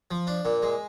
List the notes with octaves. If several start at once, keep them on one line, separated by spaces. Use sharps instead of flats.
F3
D4
A#2
G#3